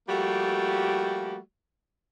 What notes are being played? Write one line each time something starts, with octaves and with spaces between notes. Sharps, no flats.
F3 G3 A3 A#3 F#4 G4